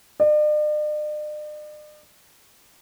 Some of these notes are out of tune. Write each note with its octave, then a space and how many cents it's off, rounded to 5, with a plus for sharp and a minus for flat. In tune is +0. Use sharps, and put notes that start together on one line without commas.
D5 +45